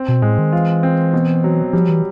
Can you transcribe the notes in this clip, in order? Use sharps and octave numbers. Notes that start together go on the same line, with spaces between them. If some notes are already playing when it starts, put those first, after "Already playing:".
Already playing: C4
B2
A2 G#3
D#3
E3 F4
C4
B2
F#3
F3 G3
E3